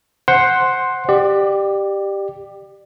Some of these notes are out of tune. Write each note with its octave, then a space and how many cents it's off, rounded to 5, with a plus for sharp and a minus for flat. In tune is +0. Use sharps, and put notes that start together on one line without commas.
C5 +0 F#5 +0 C6 +10
G4 +0 D5 +30